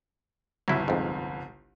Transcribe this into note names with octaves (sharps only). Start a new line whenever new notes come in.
G1 C2 F#3 E4
F2 G#2